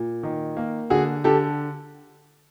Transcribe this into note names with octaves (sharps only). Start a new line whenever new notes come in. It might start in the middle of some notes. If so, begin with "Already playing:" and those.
Already playing: A#2
D#3
A#3
D3 F#4 G#4
D3 G4 A4